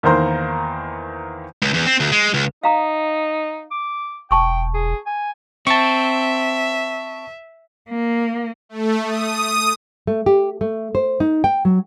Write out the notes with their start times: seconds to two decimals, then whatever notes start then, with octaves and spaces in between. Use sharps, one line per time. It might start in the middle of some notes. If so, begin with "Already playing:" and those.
0.03 E2 D#3 A#3 C5 A#5 C6
1.62 C#2
1.74 E2
1.86 C4
2.00 D2
2.12 G#3
2.34 C#2
2.63 D#4 F5 A#5 D#6
3.71 D6
4.31 E1 G5 A5 C#6 D#6
4.74 G#4
5.06 G#5
5.67 C4 E5 A5 C#6
7.89 A#3
8.69 A3
9.05 D#6
10.07 A3
10.26 G4
10.61 A3
10.95 C5
11.20 D#4
11.44 G5
11.65 F#3